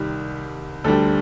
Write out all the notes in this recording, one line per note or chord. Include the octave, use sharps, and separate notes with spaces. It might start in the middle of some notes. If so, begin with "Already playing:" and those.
Already playing: C2 D#3 G3
D2 D3 G3 A4